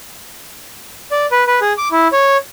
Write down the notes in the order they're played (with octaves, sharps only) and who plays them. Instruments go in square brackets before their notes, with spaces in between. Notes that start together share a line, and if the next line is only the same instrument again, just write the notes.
[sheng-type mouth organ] D5
B4
B4
G#4
D6
E4
C#5